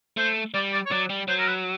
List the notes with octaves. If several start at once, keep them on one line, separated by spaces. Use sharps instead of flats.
A3 C5
G3 D5
D5
C#5
F#3 D5
G3
F#3 C5
A#4
B4